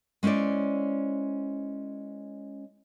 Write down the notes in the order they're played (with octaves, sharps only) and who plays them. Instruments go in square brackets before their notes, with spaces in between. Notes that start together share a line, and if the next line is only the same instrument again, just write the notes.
[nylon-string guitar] G#3 C#4 E4 C5 D5